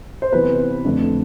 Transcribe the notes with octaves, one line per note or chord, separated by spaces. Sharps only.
C5
C3 E3 B3 B4
F2 D3 A3 D4